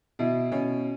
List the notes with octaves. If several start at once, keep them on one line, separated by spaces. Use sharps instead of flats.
B2 E4
B2 C#4